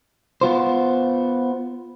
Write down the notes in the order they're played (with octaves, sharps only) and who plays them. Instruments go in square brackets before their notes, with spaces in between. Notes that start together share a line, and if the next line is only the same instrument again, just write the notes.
[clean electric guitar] B3 F4 C5